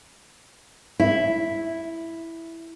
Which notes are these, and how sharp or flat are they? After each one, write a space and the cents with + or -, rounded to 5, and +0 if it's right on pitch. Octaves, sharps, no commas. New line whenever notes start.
E4 +0 E5 +0